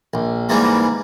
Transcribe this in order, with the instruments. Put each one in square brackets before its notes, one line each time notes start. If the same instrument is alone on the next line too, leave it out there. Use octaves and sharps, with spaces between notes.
[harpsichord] A#1
G#2 E3 G3 A#3